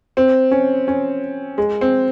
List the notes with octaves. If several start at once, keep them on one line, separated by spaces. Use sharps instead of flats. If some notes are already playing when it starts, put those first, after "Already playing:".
C4
C#4
C#4
G#3
C4